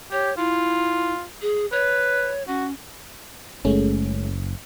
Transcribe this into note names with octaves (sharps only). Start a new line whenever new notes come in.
G4 C#5
E4 F4
G#4
B4 C#5
C#4 F#4
F#1 G#3 A3 C#4